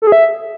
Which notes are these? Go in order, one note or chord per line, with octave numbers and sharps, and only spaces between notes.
A4
G#4
E5